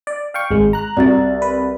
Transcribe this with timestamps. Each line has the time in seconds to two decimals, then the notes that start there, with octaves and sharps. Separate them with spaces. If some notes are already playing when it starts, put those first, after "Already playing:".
0.07 D5
0.34 F5 G5 C#6
0.51 G#1 G#3
0.73 A#5 F#6
0.97 C2 F#4 D5 A6
1.42 B4